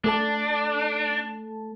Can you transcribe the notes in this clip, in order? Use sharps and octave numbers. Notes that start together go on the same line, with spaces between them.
A3 D4 A4 A5